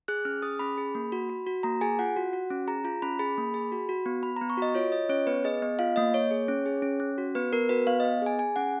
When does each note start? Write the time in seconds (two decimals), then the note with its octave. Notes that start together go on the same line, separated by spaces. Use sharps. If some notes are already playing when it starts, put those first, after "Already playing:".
0.08 G#4 F#6
0.25 C#4 F6
0.42 G#4 D#6
0.59 C#4 B5
0.78 G#4
0.95 A#3
1.12 F#4
1.29 F#4
1.47 F#4
1.63 A#3 A#5
1.81 G#4 G#5
1.99 F4 F#5
2.16 F#4
2.33 F#4
2.50 C#4
2.67 G#4 A#5
2.84 F4 A#5
3.02 C#4 B5
3.19 G#4 B5
3.37 A#3
3.54 G#4
3.72 F#4
3.89 F#4
4.06 B3
4.23 B3 B5
4.36 B3 A#5
4.50 C#6
4.57 F#4 D#5
4.75 F4 C#5
4.92 F4 D#5
5.09 C#4 C#5
5.27 B3 B4
5.45 G#4 D#5
5.62 B3 D#5
5.79 F4 F5
5.96 A#3 D#5
6.14 A#3 C#5
6.31 G#4
6.48 C#4
6.66 G#4
6.82 C#4
7.00 C#4
7.18 F#4
7.35 B3 B4
7.53 B3 A#4
7.69 F#4 B4
7.87 B3 F5
8.00 B3 D#5
8.22 G#4 G#5
8.39 G#4 G#5
8.56 C#4 F#5